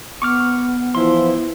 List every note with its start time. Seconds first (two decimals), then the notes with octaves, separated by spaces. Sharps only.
0.22 B3 C#6 D6 F6
0.95 E3 F3 E4 C6